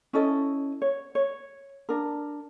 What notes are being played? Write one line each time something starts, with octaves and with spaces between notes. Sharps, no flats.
C#4 E4 A4 D#5
C#5
C#5
D4 A#4